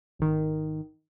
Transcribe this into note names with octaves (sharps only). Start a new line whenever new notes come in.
G#1 D#3